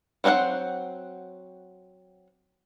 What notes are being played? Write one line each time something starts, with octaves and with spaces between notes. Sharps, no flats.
F#3 C4 D4 C5 F#5